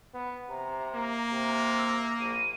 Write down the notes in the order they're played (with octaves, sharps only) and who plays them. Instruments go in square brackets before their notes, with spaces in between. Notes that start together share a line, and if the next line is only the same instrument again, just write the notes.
[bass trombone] B3
[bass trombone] C3 [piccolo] A#5
[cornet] A#3
[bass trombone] C3
[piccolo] E6
[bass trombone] A#1 [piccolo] D#7